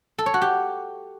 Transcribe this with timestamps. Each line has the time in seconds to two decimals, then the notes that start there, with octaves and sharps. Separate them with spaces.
0.18 A4
0.26 C#5
0.34 F#4
0.42 G4